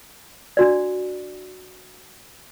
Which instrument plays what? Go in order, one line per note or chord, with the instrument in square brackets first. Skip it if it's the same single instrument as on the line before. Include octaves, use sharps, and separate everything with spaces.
[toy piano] D4 F#4 D5